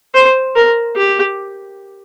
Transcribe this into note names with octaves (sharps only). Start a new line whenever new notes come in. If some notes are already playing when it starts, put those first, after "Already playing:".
C5
A#4
G4